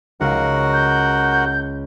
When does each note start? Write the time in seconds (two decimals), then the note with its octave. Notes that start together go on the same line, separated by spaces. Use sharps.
0.21 C#2 F#4 A#4 F#5
0.73 G6